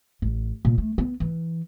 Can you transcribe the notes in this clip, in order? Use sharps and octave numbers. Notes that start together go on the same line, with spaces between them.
A1
A#2
A3
B3
E3